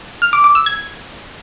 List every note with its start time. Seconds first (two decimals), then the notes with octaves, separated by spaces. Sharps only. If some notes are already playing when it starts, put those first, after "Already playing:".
0.22 F6
0.33 D6
0.44 D6
0.55 E6
0.66 G#6